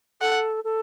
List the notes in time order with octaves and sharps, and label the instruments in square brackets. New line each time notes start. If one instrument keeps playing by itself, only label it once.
[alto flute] A4 [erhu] F#5
[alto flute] A4